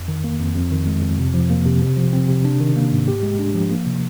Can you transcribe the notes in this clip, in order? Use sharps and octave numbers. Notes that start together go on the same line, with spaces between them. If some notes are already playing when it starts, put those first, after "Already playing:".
Already playing: F2
D#3
A#3
F2
F2
D#3
G#3
F2
C3
F3
A#3
C3
C3
F3
C4
C3
D4
D#3
A#3
G#2
G4
G#3
D4
F3
A#3
C3